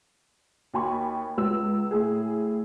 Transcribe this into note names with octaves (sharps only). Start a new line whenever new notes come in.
D#2 F#4 G#5 B5 C#6
C#2 E6
A2 G#4